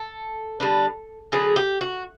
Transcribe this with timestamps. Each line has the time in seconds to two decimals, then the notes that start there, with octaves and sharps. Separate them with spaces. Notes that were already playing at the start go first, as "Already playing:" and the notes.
Already playing: A4
0.60 D3 G3 B3 D4
1.32 D3 F#3 B3 G#4
1.56 G4
1.81 F#4